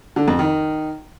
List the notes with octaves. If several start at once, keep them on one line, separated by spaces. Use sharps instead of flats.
D3
F2
D#3